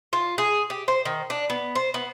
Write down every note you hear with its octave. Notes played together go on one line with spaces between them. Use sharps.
F4
G#4
G4
C5
D#3
D4
B3
C5
B3